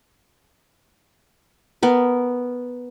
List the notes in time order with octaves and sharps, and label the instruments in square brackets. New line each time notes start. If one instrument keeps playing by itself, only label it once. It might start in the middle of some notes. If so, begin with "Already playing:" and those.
[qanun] B3 A#4